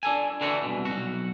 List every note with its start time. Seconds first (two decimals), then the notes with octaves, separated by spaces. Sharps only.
0.03 D4 A4 G#5
0.41 D3 E3 A3 D4 F#4
0.63 C2 B2
0.85 B1 F#4